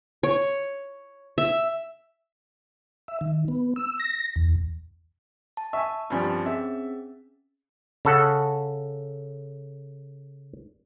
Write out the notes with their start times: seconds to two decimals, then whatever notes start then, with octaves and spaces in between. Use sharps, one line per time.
0.23 C#5
1.38 E5
3.08 E5
3.21 D#3
3.48 B3
3.76 E6
4.00 A#6
4.36 E2
5.57 A5
5.73 E5 G#5 C#6
6.10 G2 F3 G3 C4 C#4 G#5
6.46 C4 C#4 G#4 E5
8.05 C#3 A4 F#5